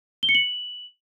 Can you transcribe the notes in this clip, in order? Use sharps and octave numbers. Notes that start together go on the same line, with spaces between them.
G7
C#7
F#7